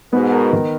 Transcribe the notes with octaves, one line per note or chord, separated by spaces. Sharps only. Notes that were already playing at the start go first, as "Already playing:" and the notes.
G#2 B2 B3
A#4
D#3